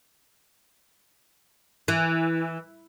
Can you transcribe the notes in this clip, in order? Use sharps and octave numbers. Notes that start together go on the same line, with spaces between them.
E3